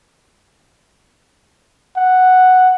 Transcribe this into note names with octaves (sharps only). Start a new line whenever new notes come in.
F#5